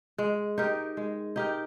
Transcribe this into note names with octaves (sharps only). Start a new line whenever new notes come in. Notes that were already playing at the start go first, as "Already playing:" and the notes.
G#3
D#4 G4 A#4
G#3
D#4 G4 A#4